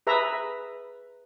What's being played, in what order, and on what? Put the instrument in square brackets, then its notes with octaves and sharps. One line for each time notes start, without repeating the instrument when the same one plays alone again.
[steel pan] G#4 B4 E5 A#5